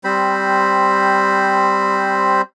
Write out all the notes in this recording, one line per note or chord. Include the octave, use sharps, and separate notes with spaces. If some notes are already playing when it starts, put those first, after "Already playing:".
G3 C4 C5 B5